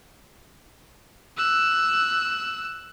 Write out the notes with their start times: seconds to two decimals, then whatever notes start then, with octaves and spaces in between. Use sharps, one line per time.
1.37 E6 F#6